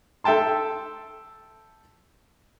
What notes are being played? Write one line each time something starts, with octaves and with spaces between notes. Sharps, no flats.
A4 E5 G5 A5 C6